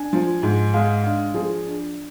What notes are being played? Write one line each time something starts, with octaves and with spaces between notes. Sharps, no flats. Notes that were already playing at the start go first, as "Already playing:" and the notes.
Already playing: D4 G#5
F3
G#2
G#3 F5
D4 F5
F3 G#4
D4